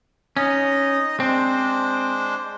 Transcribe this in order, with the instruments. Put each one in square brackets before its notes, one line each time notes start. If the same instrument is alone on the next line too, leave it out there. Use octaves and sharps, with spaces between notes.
[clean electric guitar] C#4 [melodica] D#4 D#5
[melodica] G#3 D4 C5 [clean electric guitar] C4